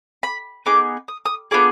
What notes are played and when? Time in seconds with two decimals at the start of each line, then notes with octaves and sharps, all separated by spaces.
0.23 B5
0.66 B3 D#4 G#4 D6
1.08 D#6
1.26 D#6
1.51 B3 D4 F4 G#4 D6